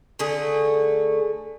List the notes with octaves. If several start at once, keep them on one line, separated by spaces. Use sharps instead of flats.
D3 A3 G#4